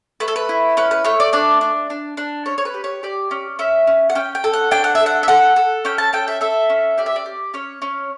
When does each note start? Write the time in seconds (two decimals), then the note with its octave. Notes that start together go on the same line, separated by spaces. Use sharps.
0.20 A3 B4
0.28 A4
0.36 B4
0.49 E4
0.77 C#4 B4
0.91 B4
1.04 A3 C#5
1.20 D5
1.33 D4 D5
1.61 D4
1.90 D4
2.17 D4
2.46 C#4 C#5
2.58 C#5
2.65 B4
2.74 G4
2.84 C#5
3.03 G4 D5
3.31 C#4
3.59 C#4 E5
3.87 C#4
4.10 F#5
4.15 C#4 G5
4.35 G5
4.44 A4
4.53 F#5
4.71 D4 G5
4.84 F#5
4.95 E5
5.00 A4
5.06 F#5
5.23 E5
5.28 A4 F#5
5.56 A4
5.85 C#4 G5
5.98 A5
6.13 A4 G5
6.28 E5
6.41 A4 E5
6.70 C#4
6.98 G4 D5
7.06 E5
7.16 D5
7.26 G4
7.54 C#4 C#5
7.82 C#4